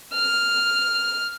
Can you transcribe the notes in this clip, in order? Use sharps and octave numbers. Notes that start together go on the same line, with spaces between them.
F6